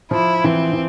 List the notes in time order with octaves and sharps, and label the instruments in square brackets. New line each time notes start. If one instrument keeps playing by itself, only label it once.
[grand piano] F3 [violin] E4
[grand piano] E3 [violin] C4
[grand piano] E3